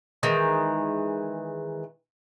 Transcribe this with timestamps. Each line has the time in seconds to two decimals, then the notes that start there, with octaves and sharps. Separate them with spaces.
0.23 D#3 E3 G#3